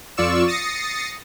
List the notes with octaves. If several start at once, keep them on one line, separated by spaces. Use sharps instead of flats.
F2 F4 D5 C#6 E6 E7
D#6 A6 A#6 C7 C#7